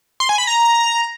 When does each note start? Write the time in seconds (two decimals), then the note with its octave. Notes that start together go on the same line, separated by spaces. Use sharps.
0.20 C6
0.29 G#5
0.38 B5
0.47 A#5